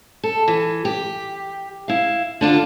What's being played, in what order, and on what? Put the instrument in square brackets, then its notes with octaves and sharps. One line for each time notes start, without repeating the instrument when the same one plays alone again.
[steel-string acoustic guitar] A4
E3
G4
E4 F5
D3 D4 F4